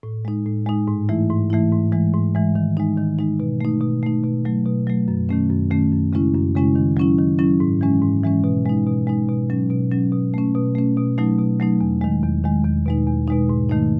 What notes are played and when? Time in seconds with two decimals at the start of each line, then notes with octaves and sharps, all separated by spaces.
0.03 A2
0.25 G#3 D#4
0.46 A2
0.66 G#3 D#4
0.88 G#2
1.09 E3 A3 E4
1.30 G#2
1.50 E3 A3 E4
1.72 G#2
1.92 E3 G#3
2.14 G#2
2.35 E3 G#3
2.55 D#3
2.77 G#3 D#4
2.98 D#3
3.19 G#3 D#4
3.40 B2
3.61 A3 D#4
3.81 B2
4.03 A3 D#4
4.24 B2
4.45 F#3 A3
4.66 B2
4.87 F#3 A3
5.08 F#2
5.29 D#3 A3 C#4
5.50 F#2
5.71 D#3 A3 C#4
5.92 F#2
6.13 C#3 G#3 C#4 E4
6.35 F#2
6.55 C#3 G#3 C#4 E4
6.76 D#3
6.97 F#3 C#4 E4
7.18 D#3
7.39 F#3 C#4 E4
7.60 G#2
7.81 E3 G#3 C#4
8.02 G#2
8.24 E3 G#3 C#4
8.44 B2
8.65 G#3 D#4
8.87 B2
9.07 G#3 D#4
9.29 B2
9.50 F#3 C#4
9.70 B2
9.91 F#3 C#4
10.12 B2
10.34 A3 C#4
10.55 B2
10.75 A3 C#4
10.97 B2
11.18 F#3 A3 D#4
11.38 B2
11.60 F#3 A3 D#4
11.81 E2
12.01 D#3 G#3
12.23 E2
12.44 D#3 G#3
12.64 E2
12.86 B2 G#3 D#4
13.07 E2
13.28 B2 G#3 D#4
13.49 G#2
13.69 D#3 A3 D#4